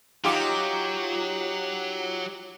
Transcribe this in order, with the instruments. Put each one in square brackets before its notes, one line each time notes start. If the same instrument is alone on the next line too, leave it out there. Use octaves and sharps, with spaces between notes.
[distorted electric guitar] F#3 [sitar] D#4 G4 [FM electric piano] F4 D6